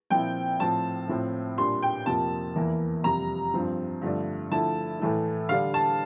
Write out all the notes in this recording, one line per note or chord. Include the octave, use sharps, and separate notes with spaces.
A#2 F3 C4 E4 G5
A2 F3 C4 A5
A2 F3 C4 E4
A#2 G3 D4 C6
G5
F2 C3 F3 A#3 A5
E2 E3 A#3 E4
F2 C3 G3 A#5
G2 F3 C4
G2 D3 F3 A3 D4
D3 F3 A3 E4 A5
A2 E3 A3 E4
D3 G3 D4 F5
A5